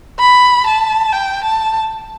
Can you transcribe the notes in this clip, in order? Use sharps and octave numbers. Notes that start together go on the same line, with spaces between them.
B5
A5
G5
A5